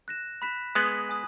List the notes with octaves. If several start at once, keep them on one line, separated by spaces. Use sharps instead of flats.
F#6 A#6 E7
B5 F#6 B6 E7
G#3 B3 D#6 G#6 D#7 F#7
G#5 D#6 F#6